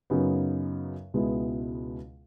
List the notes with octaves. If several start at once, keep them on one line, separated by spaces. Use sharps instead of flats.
F#2 C#3 F#3 B3 D#4
C#2 B2 G#3 B3 E4